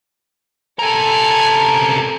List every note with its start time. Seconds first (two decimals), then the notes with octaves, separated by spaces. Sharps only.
0.79 C3 A4 A#4 G#5